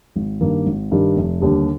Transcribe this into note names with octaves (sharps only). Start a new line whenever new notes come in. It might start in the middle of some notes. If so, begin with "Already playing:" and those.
G#1
G2 D#3 A#3
G#1
G2 D#3 G3
F1
D#2 D3 G3 D4